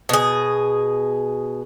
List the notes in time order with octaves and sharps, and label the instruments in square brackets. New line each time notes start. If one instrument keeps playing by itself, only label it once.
[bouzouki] B2 G#4